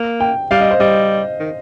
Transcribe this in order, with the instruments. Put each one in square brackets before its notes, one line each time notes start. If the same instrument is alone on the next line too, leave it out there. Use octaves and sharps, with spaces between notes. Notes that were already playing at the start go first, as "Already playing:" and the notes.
Already playing: [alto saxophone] A#3
[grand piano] G5
[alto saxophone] G3 [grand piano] F5
[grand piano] D#5
C5
[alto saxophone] G3 [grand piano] D#5
[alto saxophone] D#3